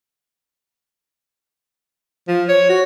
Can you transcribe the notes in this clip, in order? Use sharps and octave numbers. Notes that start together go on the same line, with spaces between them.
F3
C#5
F#4